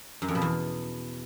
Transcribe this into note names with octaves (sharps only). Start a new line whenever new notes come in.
F#2
F2
B2
E2